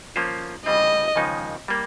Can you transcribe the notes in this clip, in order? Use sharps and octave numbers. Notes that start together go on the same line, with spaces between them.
F3 A#3 C#4 F4 C5
C#3 G3 C4 D#5
D#2 C#3 F3 G#3 D#4
G3 A#3